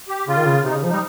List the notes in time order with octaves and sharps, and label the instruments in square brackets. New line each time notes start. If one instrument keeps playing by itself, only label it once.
[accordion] G4
[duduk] C#3 [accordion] F4
[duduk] D#3
C#3
[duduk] C3 [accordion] D#4
[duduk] C#3
F3
[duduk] G3 [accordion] D#4